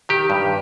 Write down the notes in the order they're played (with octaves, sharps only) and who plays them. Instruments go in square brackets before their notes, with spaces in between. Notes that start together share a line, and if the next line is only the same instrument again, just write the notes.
[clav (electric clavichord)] D#3 G4
G2